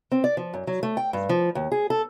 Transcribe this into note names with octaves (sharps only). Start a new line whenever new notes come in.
C4
D5
F3
F#2
F#3
A3
G5
G2
F3
D#2
G#4
A4